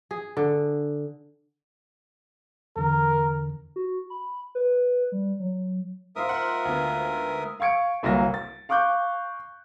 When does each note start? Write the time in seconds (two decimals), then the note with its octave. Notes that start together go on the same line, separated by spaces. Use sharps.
0.11 G#4
0.37 D3
2.77 E2 D3 A#4
3.76 F#4
4.10 B5
4.55 B4
5.12 G3
5.40 F#3
6.16 G#2 F4 A#4 E5 C6 D#6
6.29 F#5
6.65 D2 B3
7.60 F5 C#6 G#6 C#7 D7
8.03 G1 C2 F#3 A#3 A#6
8.34 A6
8.69 F5 C#6 D6 F#6 G6